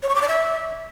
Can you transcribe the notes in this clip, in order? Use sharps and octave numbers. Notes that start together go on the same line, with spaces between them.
C#5
C#6
D6
D5
E5